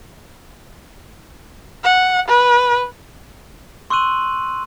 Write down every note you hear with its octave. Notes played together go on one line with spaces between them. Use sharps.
F#5
B4
C6 C#6 E6 F#6 D#7 F#7